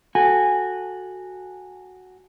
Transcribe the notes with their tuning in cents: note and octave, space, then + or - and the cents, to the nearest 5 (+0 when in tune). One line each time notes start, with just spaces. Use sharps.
F#4 +0 A4 +0 G#5 -15